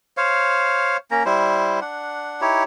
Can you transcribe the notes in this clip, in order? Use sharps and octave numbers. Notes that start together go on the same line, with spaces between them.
C5 C#5 F5
A#3 C#4 A#5
G3 E4 C5
D4 F#5
D#4 E4 G4 C#5